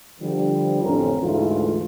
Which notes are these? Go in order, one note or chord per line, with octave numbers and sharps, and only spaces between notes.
D3 F3 G3
A1 F2 D3 C4 C#4 A#4
D2 G#2 E3 A3 F4